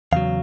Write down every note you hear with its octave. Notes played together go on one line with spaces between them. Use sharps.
E2 C#3 F#3 F5